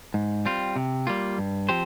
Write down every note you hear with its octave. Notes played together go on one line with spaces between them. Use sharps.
G#2
G3 C4 F4
C3
G3 A#3 F4
G2
F3 C4 G4 C5